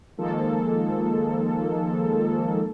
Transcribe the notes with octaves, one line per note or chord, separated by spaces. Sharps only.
D#3 F3 G#3 A#3 A4